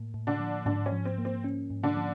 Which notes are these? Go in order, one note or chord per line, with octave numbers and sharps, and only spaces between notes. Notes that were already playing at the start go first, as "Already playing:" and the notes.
Already playing: A2 A#3
A2
D3 D4
F3
G#2 D3 D4
C#4
F3
C4
A#3
C4
C#4
G#2
D3 D4
F3